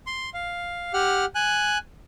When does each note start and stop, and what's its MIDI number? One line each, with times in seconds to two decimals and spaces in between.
0.07 0.30 84
0.34 0.93 77
0.93 1.25 67
0.93 1.25 78
0.93 1.25 89
1.35 1.78 80
1.35 1.78 90